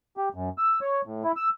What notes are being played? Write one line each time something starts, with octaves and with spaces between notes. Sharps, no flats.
G4
F#2
E6
C#5
A2
E4
E6